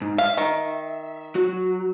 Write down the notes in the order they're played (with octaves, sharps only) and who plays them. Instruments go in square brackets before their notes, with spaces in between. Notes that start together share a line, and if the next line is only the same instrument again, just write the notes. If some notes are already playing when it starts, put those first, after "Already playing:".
[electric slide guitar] G#2
[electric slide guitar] E5 [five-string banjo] F5
[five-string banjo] D#3
[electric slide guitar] F#3 F#4